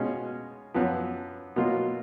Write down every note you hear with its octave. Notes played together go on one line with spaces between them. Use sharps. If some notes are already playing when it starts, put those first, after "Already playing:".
Already playing: B2 G#3 C#4 F4
F#2 F3 B3
B2 F#3 A#3 F4